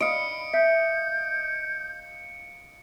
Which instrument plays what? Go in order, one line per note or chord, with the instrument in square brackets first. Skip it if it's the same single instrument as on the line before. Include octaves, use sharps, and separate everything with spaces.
[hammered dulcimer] D#5 F5 [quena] B5 [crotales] C#7 D7
[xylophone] E5 [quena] G6